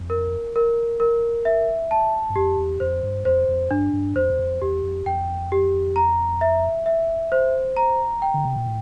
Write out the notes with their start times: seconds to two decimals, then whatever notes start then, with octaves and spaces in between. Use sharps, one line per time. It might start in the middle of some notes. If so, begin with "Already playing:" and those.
Already playing: F2
0.10 A#4
0.56 A#4
1.00 A#4
1.45 E5
1.91 A5
2.30 G2
2.36 F2 G4
2.58 E2
2.80 F2 C5
3.03 G2
3.25 F2 C5
3.48 F2
3.71 G2 D4
3.93 G2
4.15 F2 C5
4.30 E2
4.39 F2
4.61 E2 G4
4.83 F2
5.06 F2 G5
5.52 G4
5.96 A#5
6.41 E5
6.86 E5
7.32 C5
7.77 A#5
8.22 G5
8.34 D3
8.45 C3
8.56 A#2
8.66 A2